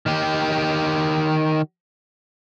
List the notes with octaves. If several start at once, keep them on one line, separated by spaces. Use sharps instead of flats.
D#3 G4